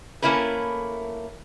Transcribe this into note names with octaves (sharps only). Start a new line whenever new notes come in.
A3 A#3 C#4 E4 A#4 B4